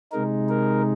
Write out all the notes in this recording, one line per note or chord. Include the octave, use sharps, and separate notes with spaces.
C3 G#3 D#4 A#4
A#4